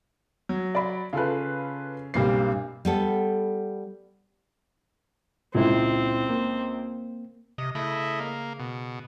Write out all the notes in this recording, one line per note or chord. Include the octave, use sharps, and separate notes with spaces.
F#3
D5 B5
C#3 F4 A4 B4
B1 G2 G3 A#3 C4 C7
G3 B3 A4
C#2 A#2 C4 E4
A#3
C3 D#5
C#3 A3 E4 D#5
A#3
B2